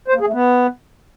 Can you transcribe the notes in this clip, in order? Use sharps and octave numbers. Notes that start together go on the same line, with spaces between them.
C5
A#3
G#4
A3
B3